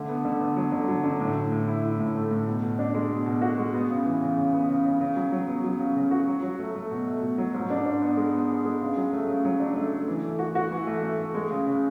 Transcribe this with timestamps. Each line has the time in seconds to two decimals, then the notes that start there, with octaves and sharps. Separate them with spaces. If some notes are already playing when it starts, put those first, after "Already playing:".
Already playing: D3 A3
0.09 B3
0.25 D3
0.40 B3
0.57 F#3
0.72 D3
0.88 F#3
1.04 D3
1.20 A2
1.35 A2
1.52 A2
1.68 E4
1.83 E4
2.00 A2
2.15 A3
2.31 A2
2.47 B2
2.63 B2
2.79 D4
2.94 G#3
3.10 B2
3.26 B2
3.41 F#4
3.58 G#3
3.74 B3
3.89 C#3
4.05 E3
4.22 C#3
4.37 C#3
4.53 B3
4.69 C#3
4.85 C#3
5.00 C#3
5.16 F#3
5.32 F#3
5.48 B3
5.64 F#3
5.79 C#3
5.96 C#3
6.11 F#4
6.28 F#3
6.43 F#3
6.59 A3
6.75 A3
6.91 B2
7.07 A3
7.22 B2
7.38 F#3
7.54 G#2
7.70 D4
7.86 D4
8.02 B3
8.17 G#3
8.33 B3
8.49 G#3
8.65 G#3
8.81 C#3
8.97 F#3
9.13 A3
9.28 C#3
9.45 F#3
9.60 D4
9.76 A3
9.93 A3
10.08 E3
10.24 A3
10.39 F#4
10.55 F#4
10.71 E3
10.87 A3
11.03 A3
11.19 A3
11.34 G#3
11.50 C#3
11.67 C#3